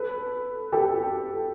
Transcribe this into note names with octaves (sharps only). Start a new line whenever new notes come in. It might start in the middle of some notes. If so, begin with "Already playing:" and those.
Already playing: A4 B4
G4 A4